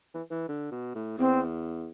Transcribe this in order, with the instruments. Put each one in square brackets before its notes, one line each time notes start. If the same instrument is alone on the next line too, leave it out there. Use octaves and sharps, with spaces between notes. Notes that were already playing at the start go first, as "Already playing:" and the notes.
[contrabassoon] E3
E3
D3
B2
A2
[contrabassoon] E2 [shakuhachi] C4